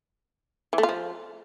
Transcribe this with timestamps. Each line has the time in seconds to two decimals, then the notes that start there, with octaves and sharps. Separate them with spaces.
0.73 E3
0.78 A3
0.83 F4
0.89 F3